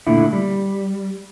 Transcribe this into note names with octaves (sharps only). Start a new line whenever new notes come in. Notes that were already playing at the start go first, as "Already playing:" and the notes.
A#2 D3 A3 E4
G3